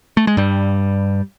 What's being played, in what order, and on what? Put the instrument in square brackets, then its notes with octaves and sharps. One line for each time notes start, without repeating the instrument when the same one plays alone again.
[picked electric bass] A3
G#3
G2 G3